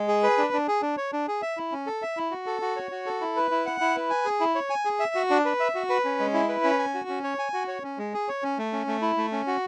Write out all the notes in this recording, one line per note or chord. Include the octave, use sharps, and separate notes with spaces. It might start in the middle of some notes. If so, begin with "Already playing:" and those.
Already playing: G#3
G#4
B4
D4
D4
G#4
D4
C#5
D4
G#4
E5
E4
C#4
A4
E5
E4
F#4
A4
F#4
C#5
F#4
A4
E4
B4
E4
F#5
E4
B4
G#5
G#4
E4
C#5
G#5
G#4
E5
F#4
D4
B4
E5
F#4
B4
C#4
G#3
E4
B4
C#4
G#5
F#4
C#4
C#5
G#5
F#4
C#5
C#4
G#3
G#4
C#5
C#4
A3
C#4
A3
E4
A3
C#4
F#4